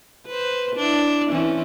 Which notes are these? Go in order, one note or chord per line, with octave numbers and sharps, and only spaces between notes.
B4 C5
D4 E4
E3 C4 C#4